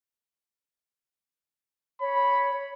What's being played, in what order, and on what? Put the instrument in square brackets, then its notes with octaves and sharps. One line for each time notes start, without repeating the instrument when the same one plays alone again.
[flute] C#5 [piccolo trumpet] B5